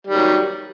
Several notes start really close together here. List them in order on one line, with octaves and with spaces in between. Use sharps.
G3 D#3 F#3